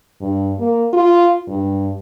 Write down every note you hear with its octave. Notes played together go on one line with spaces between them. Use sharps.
G2
A#3
F4
G2